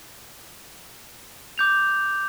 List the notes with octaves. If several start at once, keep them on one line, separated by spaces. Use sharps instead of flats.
D6 G6 F7